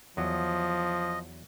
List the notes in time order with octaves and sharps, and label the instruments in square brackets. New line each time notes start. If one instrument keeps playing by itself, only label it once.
[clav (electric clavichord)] E2 F#3 [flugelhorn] F3 [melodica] D#5